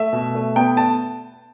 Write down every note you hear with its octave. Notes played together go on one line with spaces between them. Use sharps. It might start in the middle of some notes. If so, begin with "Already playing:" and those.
Already playing: A3 E5
B2
A3
B3 G5
A5